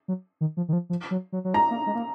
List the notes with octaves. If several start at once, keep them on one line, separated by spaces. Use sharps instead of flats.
F#3
D#3
F3
D#3
F3
F3
F#3
F#3
F#3
G#3 A#5
A#3
G#3
A#3